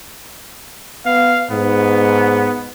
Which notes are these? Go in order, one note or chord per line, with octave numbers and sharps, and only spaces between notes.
B3 F5
G#2 B3